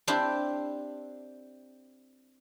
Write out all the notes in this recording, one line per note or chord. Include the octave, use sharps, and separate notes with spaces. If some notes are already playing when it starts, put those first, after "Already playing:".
C4 D4 E4 G4